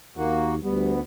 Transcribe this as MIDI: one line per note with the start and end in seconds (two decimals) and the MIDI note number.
0.17 0.62 39
0.17 0.54 58
0.17 0.54 66
0.63 1.00 38
0.63 0.93 55
0.63 1.00 59